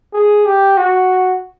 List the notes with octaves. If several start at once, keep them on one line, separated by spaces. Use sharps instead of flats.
G#4
G4
F#4